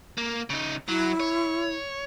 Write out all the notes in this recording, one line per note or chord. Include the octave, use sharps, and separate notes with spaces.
A#3
C#3 D#4
F#3 E4
C#5